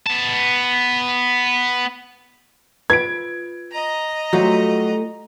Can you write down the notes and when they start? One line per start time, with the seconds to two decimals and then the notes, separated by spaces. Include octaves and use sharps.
0.06 B3 A5
2.90 F4 B4 G#6 D7
3.72 D#5 A#5
4.33 F#3 G3 A3 F4